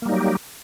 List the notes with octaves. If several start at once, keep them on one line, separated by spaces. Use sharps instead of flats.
F#3 G3 A#3 D#4 G4